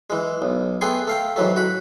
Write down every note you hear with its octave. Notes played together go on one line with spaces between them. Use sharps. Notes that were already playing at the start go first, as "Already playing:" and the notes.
E3 G#3
B1
A3 B3 G#4 G5 G#5 C6
A3 F5 G5
G#2 E3 F#3 A3
F#4 B5